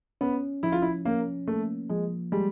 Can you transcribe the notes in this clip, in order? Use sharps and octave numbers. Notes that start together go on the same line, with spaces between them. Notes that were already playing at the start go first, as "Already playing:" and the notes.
B3 C#4
F3 E4
F4
E4
A#3 C#4
A3 A#3
F3 G#3
G3 G#3